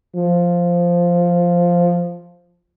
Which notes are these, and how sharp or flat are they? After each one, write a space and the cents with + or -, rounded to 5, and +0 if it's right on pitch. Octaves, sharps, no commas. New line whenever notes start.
F3 +0